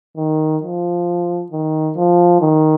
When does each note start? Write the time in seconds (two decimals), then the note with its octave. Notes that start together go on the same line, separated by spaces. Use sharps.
0.17 D#3
0.62 F3
1.51 D#3
1.97 F3
2.41 D#3